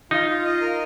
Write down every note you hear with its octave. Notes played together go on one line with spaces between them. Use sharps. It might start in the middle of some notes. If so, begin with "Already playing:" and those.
D#4 F4
F4
D#5
A#4